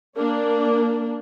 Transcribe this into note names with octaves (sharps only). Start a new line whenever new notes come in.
A#3 D4